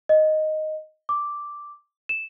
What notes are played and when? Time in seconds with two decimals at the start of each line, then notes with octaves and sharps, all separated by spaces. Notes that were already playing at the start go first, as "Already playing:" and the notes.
0.09 D#5
1.09 D6
2.09 E7